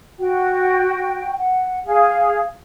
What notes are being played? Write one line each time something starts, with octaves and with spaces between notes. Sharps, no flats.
F#4 G5
F#5
G#4 F5